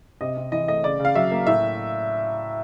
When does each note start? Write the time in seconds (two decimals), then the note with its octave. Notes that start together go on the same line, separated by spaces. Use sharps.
0.21 C3 D#5
0.37 C3
0.52 E3 D#5
0.68 A3 D#5
0.83 C#3 D5
0.99 C#3
1.05 F5
1.15 F#3 E5
1.31 A#3
1.47 A2 E5